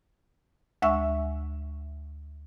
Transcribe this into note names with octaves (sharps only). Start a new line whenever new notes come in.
D2 G#3 E5 F#5 C#6 E6